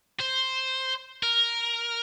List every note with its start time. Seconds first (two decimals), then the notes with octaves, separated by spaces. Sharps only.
0.20 C5
1.23 A#4